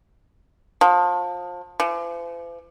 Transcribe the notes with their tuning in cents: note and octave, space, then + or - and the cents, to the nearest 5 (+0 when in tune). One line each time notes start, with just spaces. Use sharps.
F3 +25
F3 -45